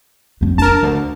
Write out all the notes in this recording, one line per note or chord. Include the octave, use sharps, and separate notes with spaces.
F2 A3
D4 A#4 A5
D2